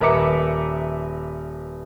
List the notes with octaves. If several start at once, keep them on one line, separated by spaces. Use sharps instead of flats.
D#1 A#4 B4 E5 D6 C#7